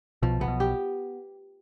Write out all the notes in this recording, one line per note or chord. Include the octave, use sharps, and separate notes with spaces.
B1 B2 F3
C3 B3
B1 B2
G4